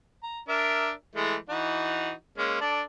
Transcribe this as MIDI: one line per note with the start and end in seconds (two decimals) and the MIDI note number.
0.23 0.39 82
0.49 0.91 62
0.49 0.91 70
0.49 0.91 76
1.16 1.36 52
1.16 1.36 56
1.16 1.36 57
1.49 2.12 52
1.49 2.12 63
1.49 2.12 66
2.38 2.58 56
2.38 2.58 58
2.38 2.58 61
2.61 2.82 62
2.61 2.82 69
2.61 2.82 74